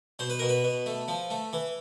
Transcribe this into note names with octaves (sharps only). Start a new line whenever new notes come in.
B2 C5
B4
B2 A#4
B4
B2
A3
F3
A3
E3